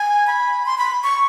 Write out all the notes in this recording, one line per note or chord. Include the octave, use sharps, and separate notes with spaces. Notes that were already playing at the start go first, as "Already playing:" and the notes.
Already playing: G#5
B5
C6
B5
C#6